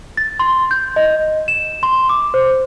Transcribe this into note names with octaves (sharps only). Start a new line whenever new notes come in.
A6
C6
G6
D#5
E7
C6
D6
C5